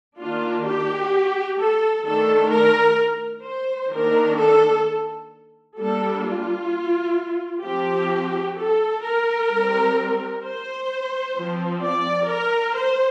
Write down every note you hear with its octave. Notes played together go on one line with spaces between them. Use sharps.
D#3 A#3 D4 F4
G4
A4
D#3 A3 D4 A4
A#4
C5
D#3 A#3 D4 A#4
A4
G3 A#3 D4 A4
F4
F3 C4 G4
A4
A#4
G3 C4
C5
F3 C4
D5
A#4
C5